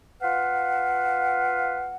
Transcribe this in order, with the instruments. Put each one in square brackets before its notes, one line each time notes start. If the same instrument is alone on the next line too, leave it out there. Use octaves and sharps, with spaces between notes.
[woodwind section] F4 B4 F5 F#5